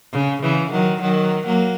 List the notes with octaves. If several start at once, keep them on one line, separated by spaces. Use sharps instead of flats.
C#3
C#3 E3
D#3 F#3
D#3 F#3
F#3 A#3